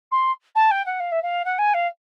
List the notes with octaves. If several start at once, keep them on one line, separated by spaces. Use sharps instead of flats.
C6
A5
G5
F#5
F5
E5
F5
F#5
G#5
F5